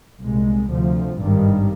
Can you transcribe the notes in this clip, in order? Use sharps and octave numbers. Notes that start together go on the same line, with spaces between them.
C2 A#2 G#3
D2 C3 F3
G#1 G2 D#3 G3